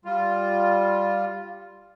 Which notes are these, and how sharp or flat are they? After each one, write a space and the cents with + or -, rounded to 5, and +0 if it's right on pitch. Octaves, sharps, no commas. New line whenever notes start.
G3 +0 F4 +0